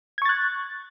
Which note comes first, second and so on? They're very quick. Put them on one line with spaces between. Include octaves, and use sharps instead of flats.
G#6 C#6 A6 F#6